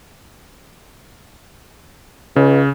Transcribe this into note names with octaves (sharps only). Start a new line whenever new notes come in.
C#2 C#3